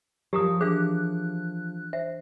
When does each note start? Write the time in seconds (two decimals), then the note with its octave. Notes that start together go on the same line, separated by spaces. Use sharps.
0.33 F3 F#3 G4 A#4 A#5 D#6
0.61 E3 D4 G#4 F5 F#6
1.93 C5 E5